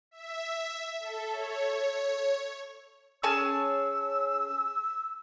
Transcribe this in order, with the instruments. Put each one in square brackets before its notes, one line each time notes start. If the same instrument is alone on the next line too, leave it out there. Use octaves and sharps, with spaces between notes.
[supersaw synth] E5
A4
C#5
[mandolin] C#4 G#4 A5 [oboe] E6